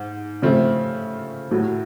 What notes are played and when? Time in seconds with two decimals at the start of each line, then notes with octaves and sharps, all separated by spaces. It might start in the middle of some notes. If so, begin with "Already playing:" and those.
Already playing: G#2
0.42 C#3 F3 A3 C4
1.51 A2 F#3 A3